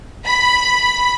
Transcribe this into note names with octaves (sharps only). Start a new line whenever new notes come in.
B5